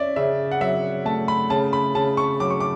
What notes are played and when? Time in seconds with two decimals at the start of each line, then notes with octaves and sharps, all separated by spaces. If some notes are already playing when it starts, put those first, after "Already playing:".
Already playing: C#4 D5 E5
0.16 C#3 E5
0.51 F#5
0.61 F#3 E5
1.06 A3 A5
1.28 B5
1.50 C#3 A5
1.73 B5
1.95 C#3 A5
2.17 C#6
2.40 F#3 D6
2.50 C#6
2.60 D6